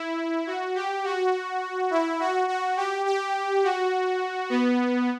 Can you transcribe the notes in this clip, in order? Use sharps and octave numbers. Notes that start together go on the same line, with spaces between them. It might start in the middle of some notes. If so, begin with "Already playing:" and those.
Already playing: E4
F#4
G4
F#4
E4
F#4
F#4
G4
G4
F#4
B3